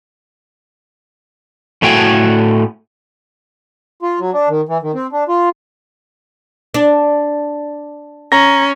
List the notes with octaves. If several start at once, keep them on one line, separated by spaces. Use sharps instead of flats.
A2 A3 E4 F#4 G5 G#5
F4
F#3
D4
D#3
E3
D#3
C4
D4
F4
D4
C#4 A#5 A#6